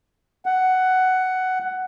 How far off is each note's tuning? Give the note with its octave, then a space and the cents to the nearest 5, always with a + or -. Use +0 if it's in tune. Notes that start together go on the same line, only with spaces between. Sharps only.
F#5 +10